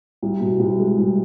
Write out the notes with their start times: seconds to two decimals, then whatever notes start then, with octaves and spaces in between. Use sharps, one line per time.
0.22 C2
0.40 B2
0.60 C2
0.79 G#3
0.98 C2